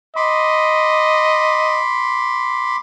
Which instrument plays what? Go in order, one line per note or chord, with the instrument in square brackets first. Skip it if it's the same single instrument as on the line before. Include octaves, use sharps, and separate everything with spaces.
[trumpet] D#5 [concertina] B5 C6 D6